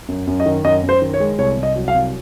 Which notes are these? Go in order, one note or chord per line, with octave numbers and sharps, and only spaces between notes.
F#2
F#2
D#5
D#3
F#2 D#5
F#2
C5
D#3
C#5
G#3
C2 C#5
C2
D#5
F#3
F5
C2